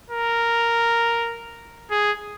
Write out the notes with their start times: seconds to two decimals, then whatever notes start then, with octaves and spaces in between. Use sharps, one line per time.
0.10 A#4
1.91 G#4